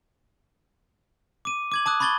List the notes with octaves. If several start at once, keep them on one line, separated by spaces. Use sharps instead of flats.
D6 D#7
D6 G#6 F#7
A5 D6 D#6 F#6
B5 C#6 G#6 A6 F#7 G7